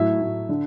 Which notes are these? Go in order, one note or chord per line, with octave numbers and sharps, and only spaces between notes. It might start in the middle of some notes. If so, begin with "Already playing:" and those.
Already playing: A2 F#3 E5
A2
D3